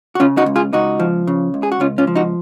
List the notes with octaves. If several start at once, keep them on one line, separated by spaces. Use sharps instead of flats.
F#4
C#3 C#4 F4
D#4 F#4
C#2
F4 G#4
C#2 D#4 F#4
F3
C#3
C#2
G#4
F#4
C#2 C#4 F4
C#4 F4
F3
D#4 F#4